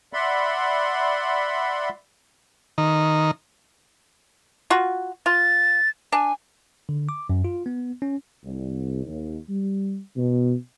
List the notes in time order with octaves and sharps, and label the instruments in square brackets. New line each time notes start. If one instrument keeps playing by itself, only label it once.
[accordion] D5 E5 F#5 B5 C6
[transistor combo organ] D#3
[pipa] F4 F#4
[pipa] F4 [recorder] A6
[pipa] D4 [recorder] G#5
[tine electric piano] D3
D6
F#2
F4
B3
C#4
[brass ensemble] C2
D#2
G3
B2